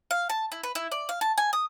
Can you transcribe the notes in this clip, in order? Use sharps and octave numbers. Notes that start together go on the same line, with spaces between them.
F5
A5
E4
B4
E4
D5
F5
A5
G#5
D#6